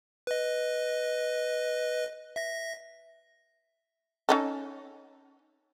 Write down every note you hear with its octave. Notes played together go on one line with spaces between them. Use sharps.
B4 D#5
E5 A#6
C#4 D#4 A4